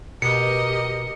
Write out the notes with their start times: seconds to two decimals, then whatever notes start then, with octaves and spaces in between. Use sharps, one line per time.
0.22 B2 G4 A#4 D#5 C#7